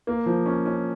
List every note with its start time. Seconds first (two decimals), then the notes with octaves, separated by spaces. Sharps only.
0.07 A#3
0.26 F3
0.46 C#4
0.66 C#4